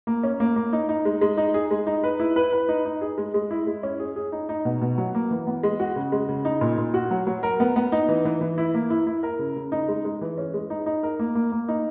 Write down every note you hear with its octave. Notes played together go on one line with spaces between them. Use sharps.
A#3
C#4
A#3
A#3
D#4
D#4
G#3
G#3
D#4
G#4
G#3
D#4
B4
E4
B4
B4
D#4
D#4
G#4
G#3
G#3
E4
G#3
C#4
G#4
G#4
D#4
D#4
B2
B2
F#3
A#3
E3
B3
G#3
F#4
C#3
G#3
C#3
D#4
A#2
A#2
F#4
F#3
F#3
A#4
B3
B3
D#4
E3
E3
E3
E4
A#3
E4
E4
A#4
C#3
C#3
D#4
G#3
G#3
E3
C#4
G#3
D#4
D#4
A#4
A#3
A#3
A#3
D#4